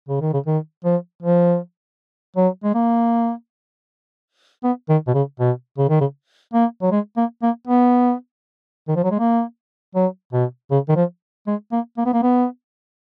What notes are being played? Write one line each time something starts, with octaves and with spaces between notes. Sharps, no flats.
C#3
D#3
C#3
D#3
F3
F3
F#3
G#3
A#3
B3
D#3
B2
C#3
B2
C#3
D#3
C#3
A#3
F#3
G#3
A#3
A#3
B3
D#3
F3
F#3
G#3
A#3
F#3
B2
C#3
D#3
F3
G#3
A#3
A#3
B3
A#3
B3